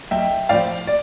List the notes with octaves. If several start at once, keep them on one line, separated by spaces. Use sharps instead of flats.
B1 E5 G5
A2 F3 D5 F5
D5